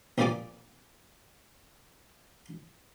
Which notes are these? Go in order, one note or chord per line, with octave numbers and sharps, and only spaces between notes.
A#1 A#2 G3 D5 G#5 D6